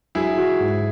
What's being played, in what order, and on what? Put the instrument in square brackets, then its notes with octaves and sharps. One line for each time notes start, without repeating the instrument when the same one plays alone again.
[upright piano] F#3 [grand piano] E4 G#4
[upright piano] F#4
G#2